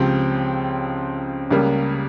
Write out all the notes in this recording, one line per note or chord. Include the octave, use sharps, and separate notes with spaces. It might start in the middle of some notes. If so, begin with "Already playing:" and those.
Already playing: C#2 C#3 F3 C4 G4
C#2 C#3 G3 A#3